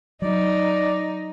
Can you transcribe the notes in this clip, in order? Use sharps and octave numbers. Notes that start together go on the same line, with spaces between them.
F#3 D#4 D5